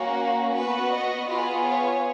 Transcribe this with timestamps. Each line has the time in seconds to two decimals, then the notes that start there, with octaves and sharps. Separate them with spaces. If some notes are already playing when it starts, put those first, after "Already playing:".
Already playing: A#3 C#4 F#4
0.55 B3 F#4 B4
0.92 D#5
1.28 B3 F4 G#4 B4
1.65 C#5